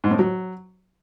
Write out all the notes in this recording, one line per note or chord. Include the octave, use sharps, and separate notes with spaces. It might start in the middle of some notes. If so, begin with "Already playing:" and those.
G#2
A2
F#3